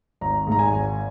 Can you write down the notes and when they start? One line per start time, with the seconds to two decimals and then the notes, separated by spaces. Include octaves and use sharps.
0.21 G#1 A#5
0.47 G#2 A#5
0.59 G#5
0.72 G#1